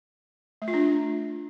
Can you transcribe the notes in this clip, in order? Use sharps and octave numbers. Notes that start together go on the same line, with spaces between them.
A3
F4
D4